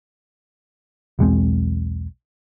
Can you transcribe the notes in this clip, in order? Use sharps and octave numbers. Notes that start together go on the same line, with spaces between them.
B1 E2 G#3 C4